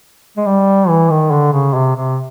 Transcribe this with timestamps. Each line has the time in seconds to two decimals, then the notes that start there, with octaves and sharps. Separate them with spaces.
0.37 G#3
0.46 G3
0.89 E3
1.10 D#3
1.31 D3
1.53 C#3
1.74 C3
1.95 C3